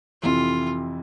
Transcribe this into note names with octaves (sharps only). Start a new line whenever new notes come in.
F2 C3 E3 F4